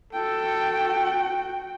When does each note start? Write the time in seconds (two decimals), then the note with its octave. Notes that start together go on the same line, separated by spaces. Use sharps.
0.13 F#4 A4 G5